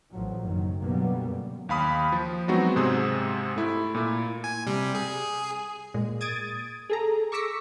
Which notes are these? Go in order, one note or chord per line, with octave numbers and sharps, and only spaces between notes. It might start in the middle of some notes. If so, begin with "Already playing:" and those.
A1 A2 F3 F#3
F#1 D#3 F#3
B2 D3 F#3 G3 A#3 B3
F#2
D#2 F5 B5 D#6
F3
F#3 G#3 B3 C4 D#4 F#4
G#2 C3 C4 G#4 D#6
A3 E4
A#2 E4
G#5
C3 G3
G#4
A#2 G#3
D#6 G#6 A6 D7 D#7
G#4 A4 A#5
C#6 D6 E6 A#6 B6 C#7